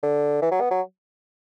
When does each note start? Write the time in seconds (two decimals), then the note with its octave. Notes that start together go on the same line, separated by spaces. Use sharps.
0.03 D3
0.42 E3
0.51 F#3
0.61 B3
0.71 F#3